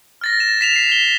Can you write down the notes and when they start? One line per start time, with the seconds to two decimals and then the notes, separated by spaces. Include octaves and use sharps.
0.21 F6 A6 A#6
0.40 E7
0.61 B6 E7 F7
0.76 C7
0.90 B6 G7